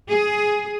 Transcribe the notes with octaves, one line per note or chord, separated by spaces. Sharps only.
G#4